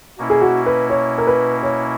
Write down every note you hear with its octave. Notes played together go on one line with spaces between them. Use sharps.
B2 A#3 C#4 E4
G#4
F#4
B4
C#5
A#4
B4
C#5